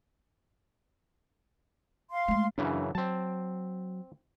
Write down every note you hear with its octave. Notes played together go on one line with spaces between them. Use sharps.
F5 C6
G#3 A3
F#2 C#3 E3 D4
F#3 C4 A5